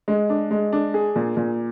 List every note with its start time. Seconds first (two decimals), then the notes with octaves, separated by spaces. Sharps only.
0.08 G#3
0.30 D4
0.51 G#3
0.73 D4
0.94 G#4
1.16 A#2
1.37 A#2